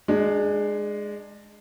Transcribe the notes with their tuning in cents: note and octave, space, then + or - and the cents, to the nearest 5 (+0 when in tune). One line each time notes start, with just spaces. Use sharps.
G#3 +0 D4 +25